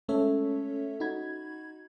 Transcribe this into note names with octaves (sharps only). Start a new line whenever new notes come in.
G#3 A3 C#4 A4 C#5 E5
D#4 F#4 B5 G#6